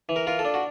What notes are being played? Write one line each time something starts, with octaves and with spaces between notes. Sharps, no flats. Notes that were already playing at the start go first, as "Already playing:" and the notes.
E3
A#4
F4 A#4
A4
D4
F#4